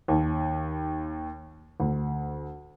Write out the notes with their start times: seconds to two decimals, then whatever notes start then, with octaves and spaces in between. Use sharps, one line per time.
0.08 D#2
1.80 D2